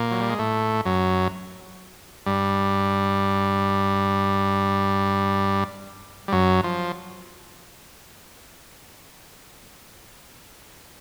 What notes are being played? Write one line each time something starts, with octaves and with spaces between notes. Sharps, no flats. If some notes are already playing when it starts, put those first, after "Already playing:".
Already playing: A#2 A#3
F#3
G3
G#3
A2 A3
F#2 F#3
G2 G3
G3
F#2 F#3
F3